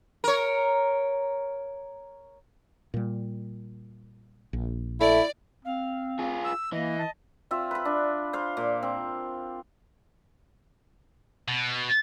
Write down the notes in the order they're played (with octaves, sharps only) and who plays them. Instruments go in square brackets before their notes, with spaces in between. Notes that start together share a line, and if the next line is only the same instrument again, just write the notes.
[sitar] A#4 C#5
[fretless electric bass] A#2 G3
A#1
[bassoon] A3 [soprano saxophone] E4 [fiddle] D5
[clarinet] C4 [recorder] F5
[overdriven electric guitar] F4 G#4
[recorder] E6
[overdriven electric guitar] E3 [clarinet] A#3 [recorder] D#5
[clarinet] A5
[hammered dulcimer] C4 F4 E5
B4 B5
D4
C5 F5
A#2
C4
[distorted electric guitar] B2